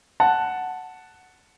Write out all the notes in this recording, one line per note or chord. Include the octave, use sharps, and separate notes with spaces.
F#5 A5